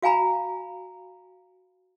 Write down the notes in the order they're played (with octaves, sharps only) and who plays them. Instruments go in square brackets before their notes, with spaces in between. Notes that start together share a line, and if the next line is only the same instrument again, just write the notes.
[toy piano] F#4 F5 G#5 A#5 B5